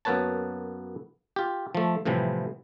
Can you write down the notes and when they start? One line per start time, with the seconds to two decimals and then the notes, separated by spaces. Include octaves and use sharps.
0.05 F#2 A#3 B3 B4 C#5 A5
1.36 F4 G4
1.75 F3 A3
2.05 A2 C3 E3 F3 G3